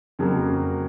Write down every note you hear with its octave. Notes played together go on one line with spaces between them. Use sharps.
F2 C#3 F#3 A#3